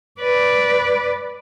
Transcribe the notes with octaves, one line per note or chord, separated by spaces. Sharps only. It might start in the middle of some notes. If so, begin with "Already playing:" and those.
B4 D5